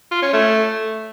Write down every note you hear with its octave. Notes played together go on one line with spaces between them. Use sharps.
F4
C#4
A3